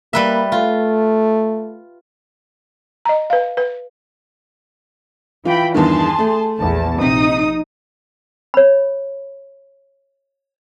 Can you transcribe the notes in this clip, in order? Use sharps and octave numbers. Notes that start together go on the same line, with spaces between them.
G3 A#3 B4 E5
A3 F4
D#5 A#5
B4 F5
B4
E3 F4 G5 B5
E2 G2 D#3 G#4 A5 C6
A3
A#1 E2 A5
A#1 C3 D#4 D#6
C#5 B5